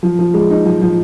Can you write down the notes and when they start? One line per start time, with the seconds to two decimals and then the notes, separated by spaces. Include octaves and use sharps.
0.03 F3
0.19 F3
0.34 G#3
0.50 D#4
0.66 F3
0.81 F3